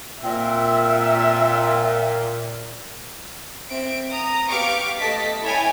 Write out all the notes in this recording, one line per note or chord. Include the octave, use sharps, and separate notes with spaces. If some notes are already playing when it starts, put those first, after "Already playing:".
A#2 C4 E5
C4 E5 D7
A#5 D#6
B3 G4 F5 C#6 D6 D7
A3 D#5 A5 B6
E4 A4 C#5 E5 G5 G#5